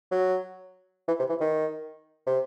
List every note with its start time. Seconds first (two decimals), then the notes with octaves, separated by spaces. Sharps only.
0.11 F#3
1.08 E3
1.19 C3
1.29 E3
1.40 D#3
2.26 C3